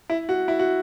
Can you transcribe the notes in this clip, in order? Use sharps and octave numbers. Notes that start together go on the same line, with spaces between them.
E4
F#4
E4
F#4